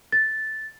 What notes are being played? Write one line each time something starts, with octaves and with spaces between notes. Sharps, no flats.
A6